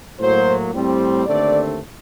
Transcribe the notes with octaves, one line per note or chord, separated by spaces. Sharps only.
A2 F#3 A#3 C5
A2 G3 C4
D#2 D3 A3 C4 D5